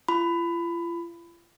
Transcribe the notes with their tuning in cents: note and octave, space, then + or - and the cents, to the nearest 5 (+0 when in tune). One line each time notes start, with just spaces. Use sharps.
F4 -40 B5 +20